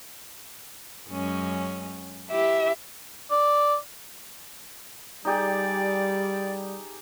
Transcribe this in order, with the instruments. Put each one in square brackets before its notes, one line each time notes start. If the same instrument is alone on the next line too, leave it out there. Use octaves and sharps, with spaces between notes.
[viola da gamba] F#2 G#3 C#4
[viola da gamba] E4 G4 [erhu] E5
[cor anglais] D5
[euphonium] G3 [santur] D#4 G4 G#4 [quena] D5